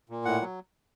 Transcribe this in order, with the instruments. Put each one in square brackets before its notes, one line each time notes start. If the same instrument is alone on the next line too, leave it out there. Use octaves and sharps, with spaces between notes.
[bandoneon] A#2
A2 F#5
F#3